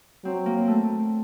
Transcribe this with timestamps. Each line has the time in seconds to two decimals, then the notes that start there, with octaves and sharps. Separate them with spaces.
0.25 F#3 C4
0.46 A#3
0.68 A3